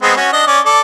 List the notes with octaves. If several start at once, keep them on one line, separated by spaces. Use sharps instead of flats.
G#3 B3 C4
C#4 F#4
D4 D#5
C#4 D5
A4 D5